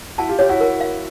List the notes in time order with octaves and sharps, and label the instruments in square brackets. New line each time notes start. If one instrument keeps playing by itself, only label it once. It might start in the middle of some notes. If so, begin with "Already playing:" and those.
[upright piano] E4 F#4 [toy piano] A5
[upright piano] F4 G4
[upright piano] F4 G4 [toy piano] C#5
[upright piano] E4 F#4
[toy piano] A#4
F5